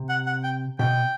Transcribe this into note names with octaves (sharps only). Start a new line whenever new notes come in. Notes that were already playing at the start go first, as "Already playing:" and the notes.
Already playing: C3
F#5
F#5
G5
B2 G5